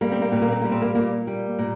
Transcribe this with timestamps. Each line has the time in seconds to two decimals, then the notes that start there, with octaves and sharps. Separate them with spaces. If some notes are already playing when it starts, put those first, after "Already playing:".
0.01 G3 A#3
0.12 C4
0.21 A#3
0.31 A#2 C4
0.42 A#3
0.51 C4
0.62 G3 A#3
0.71 C4
0.82 A#3
0.95 A#2 A#3
1.27 G3
1.59 A#2